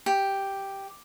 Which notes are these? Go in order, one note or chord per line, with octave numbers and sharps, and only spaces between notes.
G4